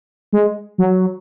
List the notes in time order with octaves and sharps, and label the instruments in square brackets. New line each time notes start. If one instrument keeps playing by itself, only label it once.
[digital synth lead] G#3
F#3